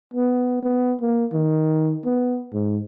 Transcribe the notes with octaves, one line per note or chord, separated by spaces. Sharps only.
B3
B3
A#3
D#3
B3
G#2